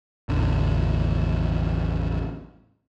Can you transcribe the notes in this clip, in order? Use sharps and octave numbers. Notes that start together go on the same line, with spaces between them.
A1 E2 D3